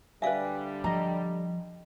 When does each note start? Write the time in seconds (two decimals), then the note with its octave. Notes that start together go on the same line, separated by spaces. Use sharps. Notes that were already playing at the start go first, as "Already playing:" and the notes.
0.22 D3 G3 B4 D5 E5 F5 G#5
0.84 F3 D#5 A#5